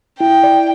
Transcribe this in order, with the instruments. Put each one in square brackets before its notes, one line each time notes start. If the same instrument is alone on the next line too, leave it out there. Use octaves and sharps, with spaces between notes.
[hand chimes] E4 [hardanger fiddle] G5
[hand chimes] D5